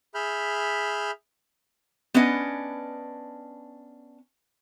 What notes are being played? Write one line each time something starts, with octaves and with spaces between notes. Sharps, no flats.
G#4 E5 B5 F6 G6
B3 C#4 D4 B4 D#5